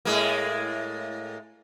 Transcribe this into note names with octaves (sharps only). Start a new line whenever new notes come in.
A2 G#3 A#3